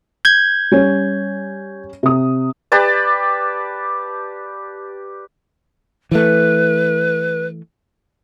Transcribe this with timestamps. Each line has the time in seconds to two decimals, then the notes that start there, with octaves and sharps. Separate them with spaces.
0.25 G6 G#6
0.72 G3 C#4 C#5
2.03 C3 D#6
2.72 G4 B4 D5 A5
6.11 E3 A3 B4